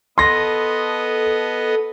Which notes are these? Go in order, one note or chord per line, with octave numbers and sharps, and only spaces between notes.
B3 A4 D#5 C6 A#6